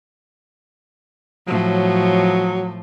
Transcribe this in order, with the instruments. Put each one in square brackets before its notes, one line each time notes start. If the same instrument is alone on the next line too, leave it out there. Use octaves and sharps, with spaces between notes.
[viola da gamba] A2 F3 [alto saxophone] F#3